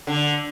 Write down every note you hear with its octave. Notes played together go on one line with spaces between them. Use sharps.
D3